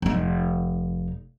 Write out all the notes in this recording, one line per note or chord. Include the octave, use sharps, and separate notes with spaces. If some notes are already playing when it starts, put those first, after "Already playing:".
F1 D#4